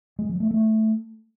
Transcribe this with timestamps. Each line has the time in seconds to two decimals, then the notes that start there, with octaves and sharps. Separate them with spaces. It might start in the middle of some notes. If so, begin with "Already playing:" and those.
0.19 G#3
0.29 F3
0.40 A3
0.51 A3